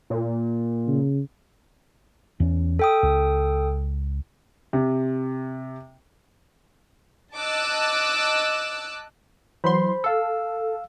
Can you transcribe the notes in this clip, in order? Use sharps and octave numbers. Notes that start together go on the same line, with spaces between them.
A#2
C#3
E2 C#4
A4 G5 D#6
C#2
C3
D#5 A5 D6 E6 F#6
E3 F#3 C5 B5 C6
A4 F5 E6